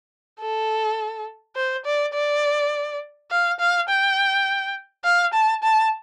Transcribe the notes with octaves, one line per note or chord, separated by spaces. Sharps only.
A4
C5
D5
D5
F5
F5
G5
F5
A5
A5